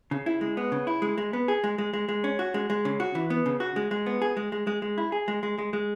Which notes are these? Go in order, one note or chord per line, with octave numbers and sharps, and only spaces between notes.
C#3
E4
G#3
B3
C#3
E4
G#3
G#3
B3
G#4
G#3
G#3
G#3
G#3
C#4
F#4
G#3
G#3
C#3
F#4
E3
B3
C#3
F#4
G#3
G#3
B3
G#4
G#3
G#3
G#3
G#3
E4
G#4
G#3
G#3
G#3
G#3